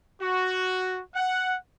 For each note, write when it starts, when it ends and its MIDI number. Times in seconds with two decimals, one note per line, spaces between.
0.21 1.00 66
1.15 1.56 78